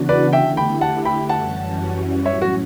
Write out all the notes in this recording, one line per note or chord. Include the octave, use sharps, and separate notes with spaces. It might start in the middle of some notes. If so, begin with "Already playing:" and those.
Already playing: C#3 E3 B3 D4 F#4
B4 D5
D3 A3 E4 G4 E5 G5
G5 B5
F#5 A5
G5 B5
F#2 E3 G3 C#4 F#4 F#5 A5
A2 F#3 C#4 C#5 E5
F#4